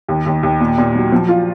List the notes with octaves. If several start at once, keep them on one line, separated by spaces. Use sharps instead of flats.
D#2
D#2
D#2
A#2
A#2
F#3
F3
F4